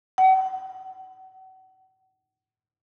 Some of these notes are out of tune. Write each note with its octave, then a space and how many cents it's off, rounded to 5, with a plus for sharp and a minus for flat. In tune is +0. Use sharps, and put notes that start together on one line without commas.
F#5 +35